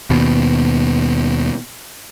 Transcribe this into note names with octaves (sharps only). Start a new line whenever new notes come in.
D#2 B2